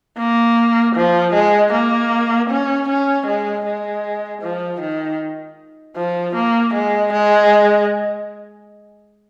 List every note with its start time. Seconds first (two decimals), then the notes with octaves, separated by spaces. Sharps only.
0.18 A#3
0.95 F3
1.34 G#3
1.72 A#3
2.50 C#4
2.88 C#4
3.27 G#3
3.65 G#3
4.42 F3
4.80 D#3
5.96 F3
6.35 A#3
6.74 G#3
7.12 G#3